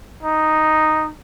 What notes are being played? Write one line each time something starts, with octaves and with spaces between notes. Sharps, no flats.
D#4